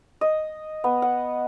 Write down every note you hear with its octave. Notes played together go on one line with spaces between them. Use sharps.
D#5
B3
F#5